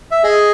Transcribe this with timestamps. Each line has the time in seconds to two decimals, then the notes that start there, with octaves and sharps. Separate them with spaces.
0.11 E5
0.24 G#4 D#5